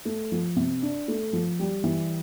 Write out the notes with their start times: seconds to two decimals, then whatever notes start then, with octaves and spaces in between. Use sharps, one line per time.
0.05 A3
0.32 F3
0.56 C3
0.82 D4
1.08 A3
1.33 F3
1.59 G3
1.84 E3